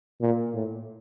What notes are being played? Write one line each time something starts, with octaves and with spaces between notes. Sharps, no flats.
A#2
A2